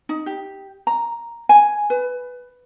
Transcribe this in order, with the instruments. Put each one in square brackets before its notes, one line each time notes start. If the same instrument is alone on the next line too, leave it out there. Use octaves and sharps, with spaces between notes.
[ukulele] D#4
G4
A#5
G#5
B4